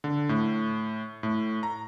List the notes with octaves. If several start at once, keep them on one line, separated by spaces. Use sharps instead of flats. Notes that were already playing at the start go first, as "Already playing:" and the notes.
D3
A2
A2
A#5